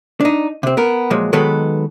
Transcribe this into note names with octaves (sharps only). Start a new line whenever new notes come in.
D4 D#4
C3 C4
B3 A#4
A#2 F3 F#3 G#3
D#3 F#3 G#3 B3 A4 B4